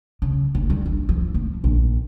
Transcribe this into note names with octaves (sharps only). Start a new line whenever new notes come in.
C#3
F#1
G3
G1
F3
A#3
A#1